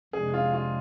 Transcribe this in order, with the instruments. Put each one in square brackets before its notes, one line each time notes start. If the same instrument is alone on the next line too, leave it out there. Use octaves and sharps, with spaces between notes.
[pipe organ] F2 C3 G#3 D4 [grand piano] G#4
[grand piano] F4
F4